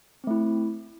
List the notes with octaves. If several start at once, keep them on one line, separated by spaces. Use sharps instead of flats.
A3 C4 E4